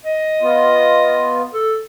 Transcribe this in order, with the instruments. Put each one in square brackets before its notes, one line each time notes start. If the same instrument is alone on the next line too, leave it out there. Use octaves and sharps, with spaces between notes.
[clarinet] D#5
[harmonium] B3 F4
[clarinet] A4